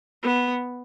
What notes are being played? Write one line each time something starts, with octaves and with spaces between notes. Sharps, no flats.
B3